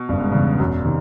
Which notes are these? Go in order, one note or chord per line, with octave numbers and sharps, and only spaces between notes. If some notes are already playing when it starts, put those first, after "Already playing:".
Already playing: B2
F#1 G2
G#2
E2 G2 C#3
E1 F#2
C3 D#3